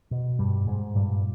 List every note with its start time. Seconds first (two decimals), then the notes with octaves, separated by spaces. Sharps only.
0.11 B2
0.39 G2 G3
0.67 G#2 G#3
0.95 G2 A#2 G3